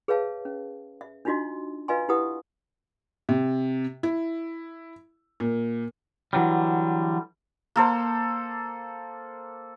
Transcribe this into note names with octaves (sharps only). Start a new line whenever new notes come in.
G#4 B4 C#5 E5 F5 A5
C#4
E5
D4 D#4 F4 F#4 D#5 C6
F4 B4 D#5 F5 G#5 C6
E4 G4 B4 F#5 D#6
C3
E4
A#2
D3 E3 F#3 G3
A#3 A4 C5